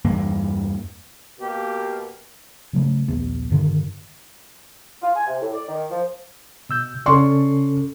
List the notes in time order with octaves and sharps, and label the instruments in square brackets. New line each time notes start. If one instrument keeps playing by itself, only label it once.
[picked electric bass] E2 G2 E3 A#3
[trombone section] B2 A#3 [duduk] G4
[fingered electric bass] C#3 F#3 A3
A#1 D#2 B3
G2 D3 D#3
[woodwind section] F4
G#5
C3
A2
D5
D#3
F3
[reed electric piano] B2 E6 G6
[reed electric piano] C#3 C#4 A4 [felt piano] D5 C6 C#6